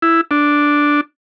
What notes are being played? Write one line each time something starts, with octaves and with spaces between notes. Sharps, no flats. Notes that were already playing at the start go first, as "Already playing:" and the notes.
E4
D4